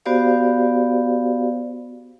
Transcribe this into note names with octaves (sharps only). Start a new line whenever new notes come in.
B3 F#4 G4 C5 D5 F5